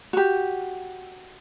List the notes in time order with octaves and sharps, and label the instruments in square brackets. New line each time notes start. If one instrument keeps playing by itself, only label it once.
[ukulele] F#4 G4